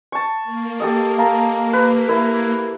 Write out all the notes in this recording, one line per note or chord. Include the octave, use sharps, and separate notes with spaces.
A5 C#6
A#3
G4 A4 D#5
F5 A5 A#5
B4
E4 A#4